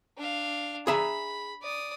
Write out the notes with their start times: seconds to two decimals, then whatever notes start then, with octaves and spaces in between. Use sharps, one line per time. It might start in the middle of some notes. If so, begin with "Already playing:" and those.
0.18 D4 F5
0.87 G#4 E5 A#5 B5
1.62 D5 D#6